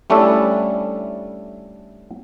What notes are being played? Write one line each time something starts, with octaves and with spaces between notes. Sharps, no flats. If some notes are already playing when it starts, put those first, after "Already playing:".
G3 A3 C#4 D4 E4 A4